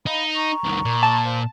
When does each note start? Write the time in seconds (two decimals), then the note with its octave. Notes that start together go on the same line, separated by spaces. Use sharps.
0.07 D#4 F5 B5
0.34 A#5 C#6
0.64 C2 D#3
0.85 A#2
1.03 A5
1.23 C5 F5